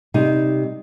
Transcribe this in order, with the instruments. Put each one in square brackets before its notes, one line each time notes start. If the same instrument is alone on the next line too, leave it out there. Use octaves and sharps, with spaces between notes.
[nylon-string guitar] C3 G3 D#4